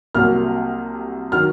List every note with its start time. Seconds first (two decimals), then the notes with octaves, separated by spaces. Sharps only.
0.15 C2 C3 F#3 A#3 F6
1.32 D#3 F#3 F6